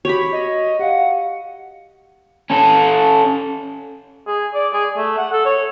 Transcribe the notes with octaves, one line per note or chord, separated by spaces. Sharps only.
F#4 G4 C#5 B5
D#5
G4 F5 F#5
C#4 A4
G#4
D5
G#4
A3
F#5
A4
C#5